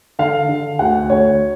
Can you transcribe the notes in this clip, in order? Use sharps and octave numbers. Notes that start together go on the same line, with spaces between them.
D3 F5
D3
D2 F#5
D2 C#5